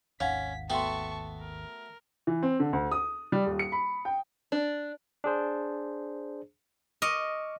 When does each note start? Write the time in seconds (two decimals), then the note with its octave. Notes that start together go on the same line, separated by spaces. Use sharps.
0.20 G#1 D#2 C#4 F5 F#5 B6
0.70 A3 B3 F#4 G5 A5 C6 C#6
1.41 A#4
2.27 E3
2.43 C4
2.60 D3
2.73 D2
2.92 D#6
3.32 G3
3.47 D#1
3.59 C#7
3.72 B5
4.05 G5
4.52 D4
5.24 D4 G#4 C5
7.02 D#5 C#6 D6 F6